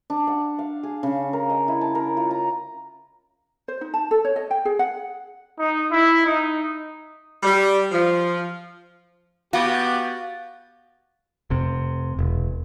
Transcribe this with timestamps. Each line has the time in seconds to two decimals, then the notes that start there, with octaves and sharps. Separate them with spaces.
0.10 D4
0.27 F#5
0.59 F5
0.83 G#4
1.03 C#3
1.33 A#4
1.50 D#5
1.68 E4
1.81 A5
1.95 A#4
2.17 F4
2.31 A#5
3.68 C5
3.81 D#4
3.94 A5
4.11 A4
4.25 C#5
4.36 D#5
4.51 G5
4.65 G#4
4.79 F#5
5.59 D#4
5.91 E4
6.26 D#4
7.43 G3
7.91 F3
9.53 B3 F#4 G4 F5 A6
11.50 F1 C3
12.19 E1